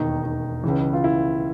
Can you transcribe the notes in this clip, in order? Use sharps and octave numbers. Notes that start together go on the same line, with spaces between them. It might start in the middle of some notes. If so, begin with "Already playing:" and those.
Already playing: E1 D#2 D#3 D#4
D#4
C#2 C#3 E3
F4
E4